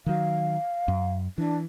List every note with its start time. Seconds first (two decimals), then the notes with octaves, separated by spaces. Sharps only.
0.06 D#3 F#3 F5
0.88 F#2
1.38 E3 D4